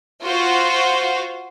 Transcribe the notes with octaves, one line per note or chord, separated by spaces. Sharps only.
F4 F#4 C5